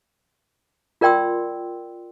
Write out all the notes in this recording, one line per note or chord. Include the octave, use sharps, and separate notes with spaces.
F4 A#4 D5 G5 C6 E6